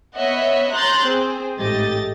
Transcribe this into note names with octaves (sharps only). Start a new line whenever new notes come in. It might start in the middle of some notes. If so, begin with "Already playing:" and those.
B3 C#5 D#5 E5 F#5
C#5 A#5 C6 F#6 G6 A6
C4 G#4 C5
A1 G#2 A3 G4 D#5 A6